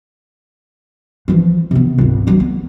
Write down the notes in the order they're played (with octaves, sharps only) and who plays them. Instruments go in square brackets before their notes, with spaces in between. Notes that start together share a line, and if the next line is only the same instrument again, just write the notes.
[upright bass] E3 F3
C3 B3
G#1 C#2
E3 F#3
B3